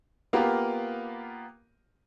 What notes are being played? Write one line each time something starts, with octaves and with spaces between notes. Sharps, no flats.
A#3 B3 F4 G4 A#4